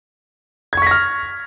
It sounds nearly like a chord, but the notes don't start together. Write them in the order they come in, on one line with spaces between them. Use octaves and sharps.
G#6 C#6 B6 A#6 F6